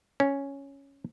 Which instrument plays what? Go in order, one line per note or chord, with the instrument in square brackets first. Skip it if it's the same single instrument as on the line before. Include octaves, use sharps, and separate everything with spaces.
[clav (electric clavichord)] C#4